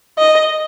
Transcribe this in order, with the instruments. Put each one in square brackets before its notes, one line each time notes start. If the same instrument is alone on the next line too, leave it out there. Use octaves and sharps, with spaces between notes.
[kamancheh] D#5